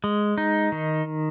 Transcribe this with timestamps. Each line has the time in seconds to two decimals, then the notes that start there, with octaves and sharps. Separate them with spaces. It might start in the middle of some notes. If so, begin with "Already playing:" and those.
0.04 G#3
0.38 D#4
0.72 D#3